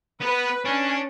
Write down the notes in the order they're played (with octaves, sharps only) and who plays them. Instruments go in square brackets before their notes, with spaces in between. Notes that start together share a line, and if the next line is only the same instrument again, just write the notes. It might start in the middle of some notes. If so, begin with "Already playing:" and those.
[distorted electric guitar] B3 [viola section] B4
[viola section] C#4 [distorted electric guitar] D4